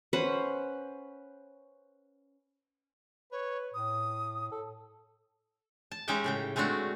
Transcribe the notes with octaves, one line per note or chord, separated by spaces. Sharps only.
C#4 B4 C5 F#5
B4 C#5
A2 D#6
A4
A5
G#3 C#4 D#4 G4 E5 G5
A2 C#3 G5
G#3 A3 C4 D4 F#4